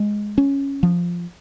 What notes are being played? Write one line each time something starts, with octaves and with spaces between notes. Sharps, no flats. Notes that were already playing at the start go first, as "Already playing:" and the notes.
Already playing: G#3
C#4
F3